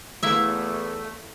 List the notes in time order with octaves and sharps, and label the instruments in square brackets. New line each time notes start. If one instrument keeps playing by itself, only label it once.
[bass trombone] E2 [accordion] A3 [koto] A#3 E4 E5